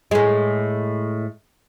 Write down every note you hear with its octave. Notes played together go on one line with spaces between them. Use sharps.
A2 G#3